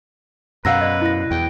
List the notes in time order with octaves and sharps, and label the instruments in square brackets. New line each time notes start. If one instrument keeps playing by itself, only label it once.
[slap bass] F#2 B2 [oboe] B4 [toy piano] F5 F#5 A#5 [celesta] E6 A#6
[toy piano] C5 D5 D#5
[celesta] E4 A#6
[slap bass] E2 [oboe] G5